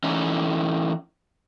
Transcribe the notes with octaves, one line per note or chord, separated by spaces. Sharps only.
E3 C#4 D#4 E4